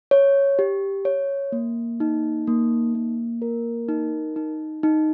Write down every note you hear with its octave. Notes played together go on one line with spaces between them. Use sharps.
C#5
G4
C#5
A#3
D#4
A#3
A#3
A#4
D#4
D#4
D#4